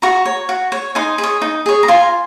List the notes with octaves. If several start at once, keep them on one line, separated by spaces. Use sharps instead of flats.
F#4 A#5 C#6
C#5
F#4
C#5
D#4 G#5 C6
G#4
C#5
D#4
G#4 C#5
A#5
F4 G#5 C6